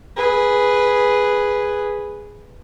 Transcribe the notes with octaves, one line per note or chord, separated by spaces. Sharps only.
G#4 B4